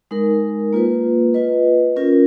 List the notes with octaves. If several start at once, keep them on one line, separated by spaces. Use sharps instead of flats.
G#3 D#4 A#4
A#3 F4 B4
F4 B4 D#5
C#4 F4 A#4